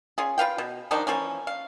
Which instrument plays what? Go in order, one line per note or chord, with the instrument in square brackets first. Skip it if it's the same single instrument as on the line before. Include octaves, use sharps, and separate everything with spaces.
[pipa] C#4 F4 G#4
F4 B4 F5 G5
B2
D#3 F3 D4 D#4
E3 F3 A#3 C#4
F5